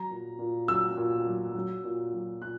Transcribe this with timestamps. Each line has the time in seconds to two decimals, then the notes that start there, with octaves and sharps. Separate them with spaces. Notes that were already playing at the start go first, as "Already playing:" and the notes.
Already playing: F#3 A#5
0.10 A#2
0.39 A#2
0.68 F#3 E6
0.97 A#2
1.26 F#3
1.55 F#3
1.84 A#2
2.13 F#3
2.42 A#2 F#6